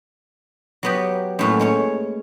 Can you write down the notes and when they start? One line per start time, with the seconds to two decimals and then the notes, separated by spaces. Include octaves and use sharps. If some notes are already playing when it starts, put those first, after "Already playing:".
0.83 F#3 B3 G4
1.39 F#2 A2 A3 A#3 C#4
1.59 G#3 C#4 C#5